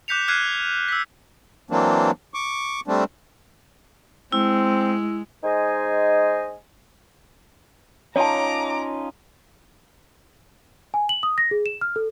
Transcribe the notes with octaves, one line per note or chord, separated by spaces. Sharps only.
D6 F#6 G6 B6 C#7 F7
D6 F6 F#6 G#6 C7 D#7
E6 B6
E3 F#3 A#3 C4 D4
C#6 D6
G3 A3 C4 D4
G#3 C4 E4
G#3 D#4 C5 D#5 G#5
C#4 D#4 F4 C#5 A5 A#5 D6
G#5
F#7
D#6
A#6
G#4
E7
F6
A4